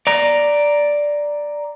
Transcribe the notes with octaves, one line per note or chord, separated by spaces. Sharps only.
D5 A#5